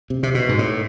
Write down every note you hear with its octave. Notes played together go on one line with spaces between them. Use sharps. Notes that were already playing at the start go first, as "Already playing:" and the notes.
C3
C3
B2
G#2
A2